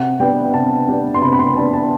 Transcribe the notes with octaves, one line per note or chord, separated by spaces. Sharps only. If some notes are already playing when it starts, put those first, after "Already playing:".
Already playing: C3 F#5
G3 B3 D4 G5
C3 A5
G3 B3 D4
C6
C3 B5
B5
C6
G3 B3 D4 A5
A5